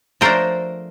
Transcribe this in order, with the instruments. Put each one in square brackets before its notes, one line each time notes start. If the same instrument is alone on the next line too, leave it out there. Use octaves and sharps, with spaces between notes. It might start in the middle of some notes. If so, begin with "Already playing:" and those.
[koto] F3 A3 D4 A#4 C5